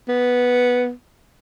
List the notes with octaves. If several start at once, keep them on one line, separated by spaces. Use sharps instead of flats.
B3